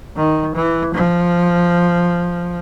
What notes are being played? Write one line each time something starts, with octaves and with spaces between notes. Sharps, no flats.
D#3
E3
F3